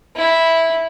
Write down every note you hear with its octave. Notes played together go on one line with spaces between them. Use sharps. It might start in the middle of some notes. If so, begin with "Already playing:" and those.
E4